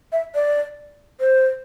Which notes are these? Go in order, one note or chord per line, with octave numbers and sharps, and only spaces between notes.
E5
D5
C5